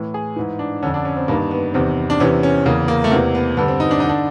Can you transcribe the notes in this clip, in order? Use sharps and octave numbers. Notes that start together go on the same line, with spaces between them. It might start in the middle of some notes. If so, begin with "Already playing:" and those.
Already playing: A2 E3
G#4
G#2 E3
D4
F2 D3 C#4
D4
C#4
C4
G2 D#3 A#3
B3
E2 C3 D#3 C4
D4
E2 C3 E3 C#4
C#4
E2 C#3 E3 A#3
A#3
A3
E2 C3 E3 A#3
B3
G2 D3 B3
C4
D#4
D4
D3 D#4
D4